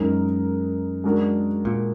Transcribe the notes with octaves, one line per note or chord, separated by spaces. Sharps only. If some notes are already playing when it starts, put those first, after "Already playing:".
Already playing: F#2 G#3 D#4 A#4
G#3 D4 F#4 A#4
A#2